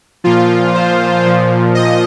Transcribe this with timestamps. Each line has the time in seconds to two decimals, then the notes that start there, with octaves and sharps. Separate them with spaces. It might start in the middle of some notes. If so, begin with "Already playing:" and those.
0.24 A#2 F3 F4
0.74 C5
1.24 A#2 F3
1.75 D#5